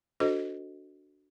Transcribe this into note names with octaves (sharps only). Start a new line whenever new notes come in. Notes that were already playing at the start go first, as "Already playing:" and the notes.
D4 F#4 A4 C5 D#5